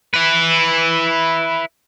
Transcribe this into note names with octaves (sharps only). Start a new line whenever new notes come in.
E4 B4